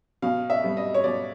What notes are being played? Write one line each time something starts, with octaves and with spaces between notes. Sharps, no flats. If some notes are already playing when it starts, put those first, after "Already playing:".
B2 F5
E5
G3 B3
D#5
C#5
B2 D5